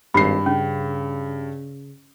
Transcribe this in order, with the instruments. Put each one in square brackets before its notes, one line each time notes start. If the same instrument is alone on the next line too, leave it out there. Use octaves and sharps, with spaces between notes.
[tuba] G#1 [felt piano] G2 C7 [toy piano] B5
[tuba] C#3 [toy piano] C#4